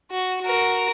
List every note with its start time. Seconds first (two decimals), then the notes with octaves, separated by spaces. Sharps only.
0.11 F#4
0.42 F#4 A#4